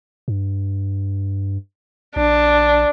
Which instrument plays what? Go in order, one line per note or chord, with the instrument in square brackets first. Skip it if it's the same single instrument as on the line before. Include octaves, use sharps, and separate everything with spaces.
[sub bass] G2
[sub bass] A#1 [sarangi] D4